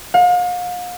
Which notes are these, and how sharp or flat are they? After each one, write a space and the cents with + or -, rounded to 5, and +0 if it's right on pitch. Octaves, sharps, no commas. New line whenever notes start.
F5 +40